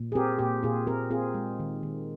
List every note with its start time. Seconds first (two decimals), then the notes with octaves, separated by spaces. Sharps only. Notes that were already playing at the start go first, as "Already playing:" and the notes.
Already playing: A#2
0.12 G#4
0.15 C4 G4 A#4
0.39 A#2 G4
0.63 A#2 F4 G#4
0.87 C4 G4 A#4
1.10 C4 F4 G#4
1.34 G#3
1.59 D#3
1.83 D#3